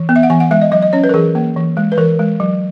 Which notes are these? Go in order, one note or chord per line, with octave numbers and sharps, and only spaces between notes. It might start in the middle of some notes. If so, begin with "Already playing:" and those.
Already playing: E3
B3
E5
F#5
E3 G#5
F#5
G#3 E5
D#5
F#3 D#5
D#5
C#4 C#5
B4
A#4
E3 G#4
A#3
E3
G#3
B4
E3 A#4
G#3
F#3